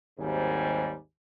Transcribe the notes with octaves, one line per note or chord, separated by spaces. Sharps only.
G#1 D#2 G#2 G3 C5 G#5